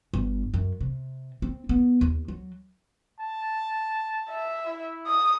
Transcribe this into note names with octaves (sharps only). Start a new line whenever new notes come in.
G1
F#2
C3
C4
B3
D#2
F#3
A5
E5
E4
D#6